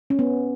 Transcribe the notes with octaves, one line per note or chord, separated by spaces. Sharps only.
C#4
B3